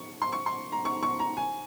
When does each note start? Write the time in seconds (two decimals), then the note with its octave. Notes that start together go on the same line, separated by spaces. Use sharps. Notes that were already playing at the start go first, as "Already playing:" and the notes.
Already playing: C#6
0.22 C6
0.32 C#6
0.46 C6
0.72 A#5
0.85 C#6
1.03 C#6
1.20 A#5
1.37 G#5